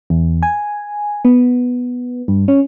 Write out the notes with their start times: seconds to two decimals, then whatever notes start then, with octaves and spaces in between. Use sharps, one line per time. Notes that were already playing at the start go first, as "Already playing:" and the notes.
0.10 E2
0.43 G#5
1.25 B3
2.28 G2
2.48 C#4